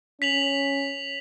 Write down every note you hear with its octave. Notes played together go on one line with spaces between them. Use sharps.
C#4 B6 F7 F#7